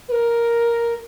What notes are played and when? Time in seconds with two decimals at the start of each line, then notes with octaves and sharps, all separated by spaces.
0.09 B4
0.12 A#4